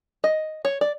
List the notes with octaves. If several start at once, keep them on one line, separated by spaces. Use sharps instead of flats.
D#5
C#5
D5